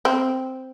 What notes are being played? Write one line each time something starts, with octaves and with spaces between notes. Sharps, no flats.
C4